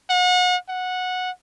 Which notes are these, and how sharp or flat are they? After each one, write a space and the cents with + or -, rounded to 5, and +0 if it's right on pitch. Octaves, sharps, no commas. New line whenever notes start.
F#5 -35
F#5 -15